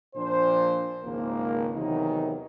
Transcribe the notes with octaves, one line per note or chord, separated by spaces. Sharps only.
A#2 F3 D4 C5
G#1 C#2 G#2 A#3
E2 C3 D#3 E3 F#3 D#4